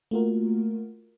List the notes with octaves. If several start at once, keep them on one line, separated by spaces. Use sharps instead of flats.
A3 A#3 F4 F#4 A#4